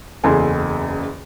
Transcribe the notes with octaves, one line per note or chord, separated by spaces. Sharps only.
F#1 E2 C#3 A4 G#5 C6